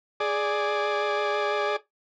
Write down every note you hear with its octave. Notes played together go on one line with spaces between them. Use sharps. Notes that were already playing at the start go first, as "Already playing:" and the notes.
G#4 D5